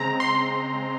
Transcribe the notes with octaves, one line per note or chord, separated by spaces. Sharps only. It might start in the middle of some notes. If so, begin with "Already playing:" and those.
Already playing: C#3 G#3 C4 A#5
C6